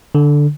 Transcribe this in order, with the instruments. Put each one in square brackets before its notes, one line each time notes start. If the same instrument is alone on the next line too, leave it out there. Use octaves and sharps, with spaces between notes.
[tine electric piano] D3